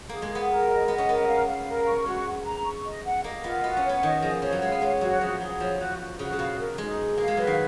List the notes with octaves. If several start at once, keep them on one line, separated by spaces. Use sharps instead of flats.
A#3 G#4
G#3
G#4
B3
A#4
D#5
B3 D#5
C#4
B3 A#4
F5
F5
A#4
C#6
G#3 F#4
F#5
A#5
C#6
D#5
F#5
A#3 D#5
B3 F4
B3 F#4
C#4
C#5
B3
D#3 D#5
F3 G#4
F3 C#5
F#3
G#3 F5
B3
G#3 C#5
F#3 F#4
F3 G#4
F#3 G#4
F3 C#5
F3 F#4
F#4
C#3 F#4
C#3
B2 F5
A#4
G#3 D#4
G#4
A#3 F5
G#3
F#3 B4
D#3